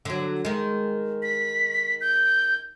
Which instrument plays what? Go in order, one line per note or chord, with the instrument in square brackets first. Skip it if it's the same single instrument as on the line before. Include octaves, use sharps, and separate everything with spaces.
[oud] D3 F#3
D#3 G#3
[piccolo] B6
G6